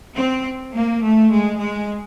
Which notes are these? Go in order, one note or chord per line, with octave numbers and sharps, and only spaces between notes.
C4
A#3
A3
G#3
G#3